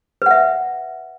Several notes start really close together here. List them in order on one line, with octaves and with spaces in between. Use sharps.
B4 F#5 E5